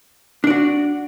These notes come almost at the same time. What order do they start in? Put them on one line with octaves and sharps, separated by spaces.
D4 D5 F#4